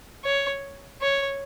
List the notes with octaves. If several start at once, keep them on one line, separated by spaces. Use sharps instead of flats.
C#5
C#5